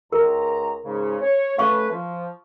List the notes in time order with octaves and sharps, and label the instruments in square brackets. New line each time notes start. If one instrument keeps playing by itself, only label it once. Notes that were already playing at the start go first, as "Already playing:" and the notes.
[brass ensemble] C#2 A#5 [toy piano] A#4
[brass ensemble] G#2 C#3
C#5
[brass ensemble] A3 C#4 B4 [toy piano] F5 C#6
[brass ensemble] F3